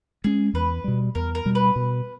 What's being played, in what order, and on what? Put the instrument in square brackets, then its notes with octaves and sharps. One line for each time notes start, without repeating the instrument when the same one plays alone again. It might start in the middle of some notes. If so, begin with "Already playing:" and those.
[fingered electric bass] G#3 C#4 [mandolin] G#4
[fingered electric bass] E2 [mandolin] B4
[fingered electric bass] B2 G3
[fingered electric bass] E2 [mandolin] A#4
[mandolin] A#4
[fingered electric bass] B2 G3
[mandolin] B4
[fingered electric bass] B2